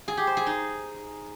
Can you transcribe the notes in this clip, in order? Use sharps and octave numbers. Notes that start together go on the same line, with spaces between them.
G#4
G4
C5
G#4
D#4